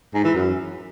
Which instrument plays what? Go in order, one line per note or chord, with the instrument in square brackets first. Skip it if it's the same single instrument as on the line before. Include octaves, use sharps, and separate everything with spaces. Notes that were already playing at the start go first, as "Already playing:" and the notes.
[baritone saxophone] G#2
E3
F#2